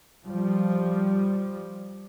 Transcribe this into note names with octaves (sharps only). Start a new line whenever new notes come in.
F3 G3